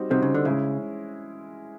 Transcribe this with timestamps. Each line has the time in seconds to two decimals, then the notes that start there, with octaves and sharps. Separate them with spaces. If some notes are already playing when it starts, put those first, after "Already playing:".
Already playing: G3 C4 D#4 F#4
0.10 C3 G3 C4 D#4 F#4
0.22 C#3
0.35 D3
0.45 C#3 G#3 C#4 E4